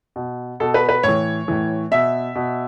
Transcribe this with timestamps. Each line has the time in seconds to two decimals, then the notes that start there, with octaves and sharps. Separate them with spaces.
0.16 B2
0.60 B2 A4
0.74 B4
0.89 B4
1.03 A2 E3 C#5
1.48 A2 E3
1.91 B2 E5
2.35 B2